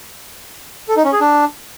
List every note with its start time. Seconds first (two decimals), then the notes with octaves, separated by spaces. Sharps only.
0.88 A4
0.97 D#4
1.05 C#4
1.13 G#4
1.21 D4